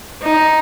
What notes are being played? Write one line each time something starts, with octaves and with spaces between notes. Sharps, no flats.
D#4